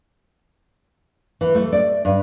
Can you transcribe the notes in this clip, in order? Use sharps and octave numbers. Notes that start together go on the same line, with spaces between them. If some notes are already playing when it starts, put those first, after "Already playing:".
E3
A3
D5
G2